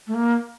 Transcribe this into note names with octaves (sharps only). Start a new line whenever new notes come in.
A3
A#3